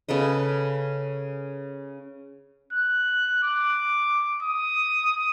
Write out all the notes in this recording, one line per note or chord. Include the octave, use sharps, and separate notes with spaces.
C#3 A4 B4 D#5
F#6
D6
D#6